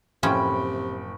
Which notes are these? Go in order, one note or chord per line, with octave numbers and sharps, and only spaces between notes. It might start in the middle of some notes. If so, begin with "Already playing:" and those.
F#1 A2 C3 F3 C#4 G5 B5 C#6